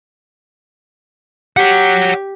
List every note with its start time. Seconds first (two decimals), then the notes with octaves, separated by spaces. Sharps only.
1.57 G4 C#5 F#5